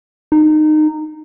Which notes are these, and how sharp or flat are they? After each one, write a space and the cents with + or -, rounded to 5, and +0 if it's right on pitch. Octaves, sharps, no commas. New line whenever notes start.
D#4 -20